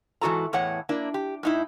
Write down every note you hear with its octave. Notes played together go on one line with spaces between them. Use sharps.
G#2 E3 G3 F#4 A4 A#5
E2 A2 C#5 F#5
A#3 D4 E4
G4
A2 D#4 E4